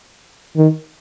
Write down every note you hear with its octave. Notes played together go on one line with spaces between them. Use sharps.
D#3